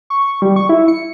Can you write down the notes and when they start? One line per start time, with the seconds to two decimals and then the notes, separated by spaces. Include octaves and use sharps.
0.10 C#6
0.42 G3
0.56 C#6
0.69 E4
0.88 C#7